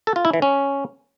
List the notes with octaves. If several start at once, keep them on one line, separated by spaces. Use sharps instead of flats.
A4
F4
E4
E3
C#4